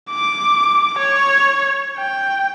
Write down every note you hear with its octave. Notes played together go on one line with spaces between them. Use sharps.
D6
C#5
G5